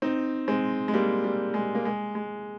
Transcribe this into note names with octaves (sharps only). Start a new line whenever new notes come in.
C4 D#4
G#3 C4
G#3
G3 A#3
G3
G#3
A#3
G#3
G#3